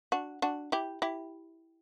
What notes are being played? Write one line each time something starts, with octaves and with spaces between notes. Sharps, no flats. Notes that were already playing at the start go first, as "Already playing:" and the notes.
D4 F#4
D4 F#4
E4 G4
E4 G4